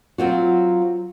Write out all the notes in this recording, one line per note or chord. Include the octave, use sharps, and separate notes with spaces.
F#3 C4 F4 F#4